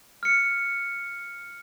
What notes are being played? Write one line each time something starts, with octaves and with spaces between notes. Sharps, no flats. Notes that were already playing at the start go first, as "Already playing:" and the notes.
F6 C#7